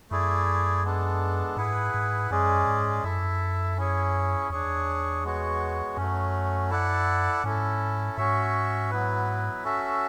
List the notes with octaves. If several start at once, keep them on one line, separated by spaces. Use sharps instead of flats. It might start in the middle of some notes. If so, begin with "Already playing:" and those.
F#2 A3 E4 G#4 D5
G#3 B3 D4 A4
G#2 E4 G#4 B4 F#5
G#2
F#2 G#3 C#4 G#4 D5
G#2
F#2 E4 A4 E5
C#4 E4 G#4 C#5
E2 D4 G#4 C#5
G#3 B3 F#4 C#5
F#2 F#3 A3 C#4
E4 A4 D5 F#5
G#2 C#4 E4 A4
G#2 C#4 F#4 C#5 E5
F#3 B3 E4 B4
C#4 F#4 A4 E5